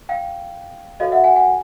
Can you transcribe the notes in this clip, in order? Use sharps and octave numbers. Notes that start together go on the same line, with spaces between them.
F5 G5
F#4 A4 C#5 D#5 F5
E5 F#5
F#5 G#5
F#5 G#5